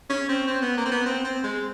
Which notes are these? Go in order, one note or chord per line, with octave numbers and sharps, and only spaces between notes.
C#4
C4
C4
B3
A#3
C4
B3
C4
C4
G#3